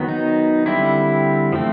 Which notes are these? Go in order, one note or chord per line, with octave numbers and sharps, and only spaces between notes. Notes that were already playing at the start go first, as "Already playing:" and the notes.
Already playing: D#3 F#3 B3
D#4
D3 G3 C4 E4
F3 A3 C4